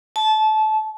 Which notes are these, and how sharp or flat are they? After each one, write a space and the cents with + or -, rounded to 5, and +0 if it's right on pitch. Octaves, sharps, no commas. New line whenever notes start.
A5 -25